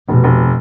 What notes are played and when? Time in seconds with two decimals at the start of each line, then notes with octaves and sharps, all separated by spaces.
0.08 F1 B2
0.24 F1